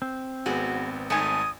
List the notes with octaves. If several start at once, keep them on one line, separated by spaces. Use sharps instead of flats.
C4
G#1 B3 F#4 G#4
G#1 A3 D#4 G#5 D#6 G#6